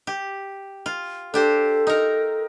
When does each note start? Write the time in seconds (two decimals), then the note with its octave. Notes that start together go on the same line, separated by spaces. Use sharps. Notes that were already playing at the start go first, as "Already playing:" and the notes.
0.07 G4
0.86 F4
1.34 D4 G4 A4 C5
1.87 D#4 A#4